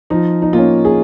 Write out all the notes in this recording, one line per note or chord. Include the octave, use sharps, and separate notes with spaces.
F3 D#4
D#4
A#3 C#4 F4
G#4